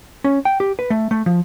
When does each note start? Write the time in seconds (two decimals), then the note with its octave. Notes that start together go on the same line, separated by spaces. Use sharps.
0.24 C#4
0.45 G5
0.60 G4
0.79 B4
0.90 A3
1.11 A3
1.26 F3